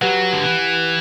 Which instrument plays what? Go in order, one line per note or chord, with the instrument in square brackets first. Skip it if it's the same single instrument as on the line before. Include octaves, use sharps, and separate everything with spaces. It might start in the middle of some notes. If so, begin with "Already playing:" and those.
[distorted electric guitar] F#3 [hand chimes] G4 B4 F#5
[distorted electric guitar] D3
E3